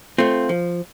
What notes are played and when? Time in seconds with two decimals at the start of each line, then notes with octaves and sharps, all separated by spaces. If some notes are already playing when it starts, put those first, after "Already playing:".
0.18 A3 C4 F4
0.49 F3